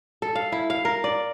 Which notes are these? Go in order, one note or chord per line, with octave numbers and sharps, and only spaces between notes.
A4
F5
E4
F5
A#4
D5